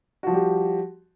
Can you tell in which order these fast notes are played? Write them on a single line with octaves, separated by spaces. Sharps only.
F#4 F3 G3 G4